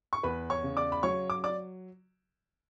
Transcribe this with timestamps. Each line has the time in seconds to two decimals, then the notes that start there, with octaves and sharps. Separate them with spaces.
0.13 C#6
0.23 E2 B4 B5
0.50 C#5 C#6
0.63 C#3
0.77 D5 D6
0.92 B5
1.03 F#3 C#5 C#6
1.30 D6
1.44 D5 D6